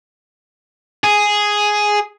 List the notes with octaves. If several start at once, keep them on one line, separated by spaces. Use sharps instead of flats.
G#4